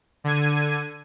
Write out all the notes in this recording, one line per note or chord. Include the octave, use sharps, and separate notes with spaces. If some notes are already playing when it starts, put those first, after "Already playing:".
D3 G#6 D#7